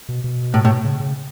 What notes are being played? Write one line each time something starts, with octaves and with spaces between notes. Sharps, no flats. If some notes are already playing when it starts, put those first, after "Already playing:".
B2
B2
A2
A2
C#3
C#3